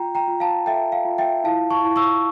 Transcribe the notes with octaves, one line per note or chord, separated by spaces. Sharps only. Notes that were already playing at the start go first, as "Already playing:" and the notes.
Already playing: F4 G5 A#5
G5 A#5
F4
F5 A5
A4 E5 G5
F5
F4
E5 G5
E4 F5 A5
A5 C#6
E4
C#6 E6